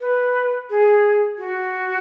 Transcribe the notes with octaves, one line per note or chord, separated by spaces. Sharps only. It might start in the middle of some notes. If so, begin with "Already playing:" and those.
B4
G#4
F#4